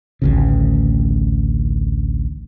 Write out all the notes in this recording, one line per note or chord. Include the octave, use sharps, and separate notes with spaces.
A1 D2 C#3